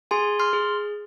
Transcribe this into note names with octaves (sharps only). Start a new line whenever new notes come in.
G#4 G#5 C6
C6 F6
G#4